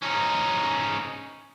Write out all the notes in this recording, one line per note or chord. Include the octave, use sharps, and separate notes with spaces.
C#4 D#4